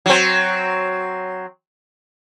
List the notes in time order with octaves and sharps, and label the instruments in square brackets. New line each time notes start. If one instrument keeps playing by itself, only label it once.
[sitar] F#3 C4